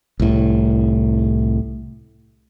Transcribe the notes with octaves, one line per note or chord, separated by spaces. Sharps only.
C2 A2